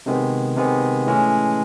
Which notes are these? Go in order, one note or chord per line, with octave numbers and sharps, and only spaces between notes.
C3 D#3 G#3 B3
C3 D#3 G#3 B3
A2 E3 G#3 C#4